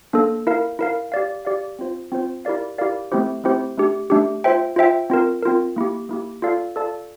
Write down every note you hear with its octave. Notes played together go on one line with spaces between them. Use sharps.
A#3 D4 A4
E4 A#4 F5
E4 A#4 F5
G4 D5 F5
G4 D5 F5
C4 F4 C5
C4 F4 C5
E4 G4 A#4 D5 F5
E4 G4 A#4 D5 F5
A3 C4 E4 G4 C5
A3 C4 E4 G4 C5
A3 D4 G4
A3 D4 G4
F4 C5 E5 G5
F4 C5 E5 G5
C4 F4 A#4
C4 F4 A#4
A#3 E4 G4
A#3 E4 G4
F4 A4 D5 F5 A5
F4 A4 D5 F5 A5